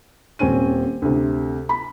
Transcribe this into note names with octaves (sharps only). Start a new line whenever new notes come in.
D#1 C4 C#4 D#7
D2 C3
B5